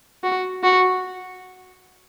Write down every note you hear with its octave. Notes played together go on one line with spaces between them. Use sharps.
F#4
F#4